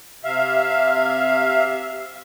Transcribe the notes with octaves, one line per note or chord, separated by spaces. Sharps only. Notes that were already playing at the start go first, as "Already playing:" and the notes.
C3 E5 F5